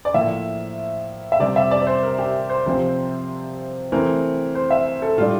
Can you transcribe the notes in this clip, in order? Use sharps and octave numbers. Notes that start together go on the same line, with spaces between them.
D5
A2 F3 A#3 E5
E5
C3 G3 C4 D5
E5
D5
D5
C5
A#4
G4
C5
C3 F3 C4
E3 A3 C4 A#4
C5
E5
A4
A2 G3 D4 F4